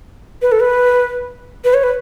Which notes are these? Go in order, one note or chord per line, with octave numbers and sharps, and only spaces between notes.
B4
A4
B4
B4
C#5
B4